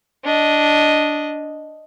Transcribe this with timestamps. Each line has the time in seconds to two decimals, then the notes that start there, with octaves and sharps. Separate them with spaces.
0.24 D4 D#5